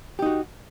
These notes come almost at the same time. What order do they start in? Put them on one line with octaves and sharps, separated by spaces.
G4 D#4 F#4